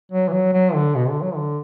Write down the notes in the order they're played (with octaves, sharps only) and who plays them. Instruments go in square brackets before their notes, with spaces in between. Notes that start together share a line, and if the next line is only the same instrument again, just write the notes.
[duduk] F#3
E3
F#3
F#3
D3
B2
D3
F#3
D3